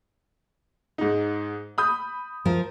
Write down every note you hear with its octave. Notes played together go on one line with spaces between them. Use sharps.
G#2 D#4
B5 D#6 G6
F3 F4 A#4